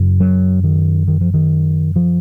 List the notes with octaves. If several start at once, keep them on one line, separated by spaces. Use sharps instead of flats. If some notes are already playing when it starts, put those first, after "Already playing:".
Already playing: F#2 C#3
F#3
D#3
D#3
F3
D#3
F3